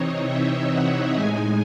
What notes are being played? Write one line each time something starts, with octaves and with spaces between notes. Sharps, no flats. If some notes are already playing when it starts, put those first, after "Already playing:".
Already playing: C3 E3 C4 D#4 C#5 D#5
E5
F#5
A2 G#3 D#4 G#5